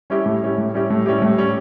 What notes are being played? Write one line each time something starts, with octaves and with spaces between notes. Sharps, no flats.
G3 C#4 E4 G4
A2
G3 C#4 E4 G4
A2
G3 C#4 E4 G4
A2
G3 C#4 E4 G4
A2
G3 C#4